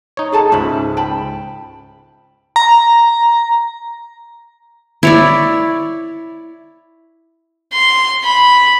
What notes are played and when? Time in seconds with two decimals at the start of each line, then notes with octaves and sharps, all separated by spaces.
0.17 D#4 C#5
0.32 G#4 A4 A5
0.52 C#2 G#2 C#4 E5 B5
0.97 G5 A5 B5
2.56 A#5
5.03 E4 C#5 D5
7.73 C6
8.24 B5